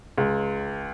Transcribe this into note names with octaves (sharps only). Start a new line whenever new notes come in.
C#2